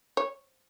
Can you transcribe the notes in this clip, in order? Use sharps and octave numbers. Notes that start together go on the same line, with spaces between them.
C#5